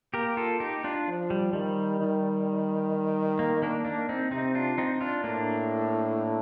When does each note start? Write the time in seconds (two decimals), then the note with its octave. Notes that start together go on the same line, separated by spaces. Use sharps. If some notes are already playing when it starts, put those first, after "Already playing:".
0.14 A#3 G4 A#4
0.37 F4 A4
0.60 D#4 G4
0.84 D4 F4
1.08 F3
1.30 G3
1.53 D#3 G3
2.00 D#3
3.39 A#3
3.62 A#3 D4
3.85 A#3 D4
4.09 C4 D#4
4.32 C3 C4 D#4
4.55 D4 F4
4.78 C4 D#4
5.01 D4 F4
5.24 A2 A#3 D4